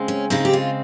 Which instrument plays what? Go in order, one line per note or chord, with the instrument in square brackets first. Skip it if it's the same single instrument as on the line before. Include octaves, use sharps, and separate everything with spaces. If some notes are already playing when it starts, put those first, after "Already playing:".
Already playing: [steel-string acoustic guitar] C#3 G#3 C4
C#4
C#3 G#3 C4 D#4
G4
F4